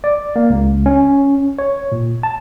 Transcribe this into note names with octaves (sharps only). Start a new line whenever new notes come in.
D5
A#3
C#2
C#4
C#5
A#2
A5